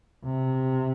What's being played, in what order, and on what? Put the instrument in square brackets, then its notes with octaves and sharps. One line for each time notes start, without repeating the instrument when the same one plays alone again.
[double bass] C3